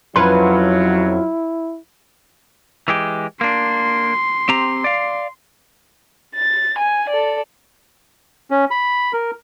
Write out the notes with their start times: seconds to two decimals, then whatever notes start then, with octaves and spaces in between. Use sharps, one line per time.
0.16 F2 F#3 C#4 E4 F4 B4 C6
2.88 E3 G#3 G4
3.41 A#3 D4 C6
4.49 C4 G4 A#5
4.84 D5 F5
6.36 A6
6.79 G#5
7.10 A4 D5
8.51 C#4
8.71 B5
9.13 A#4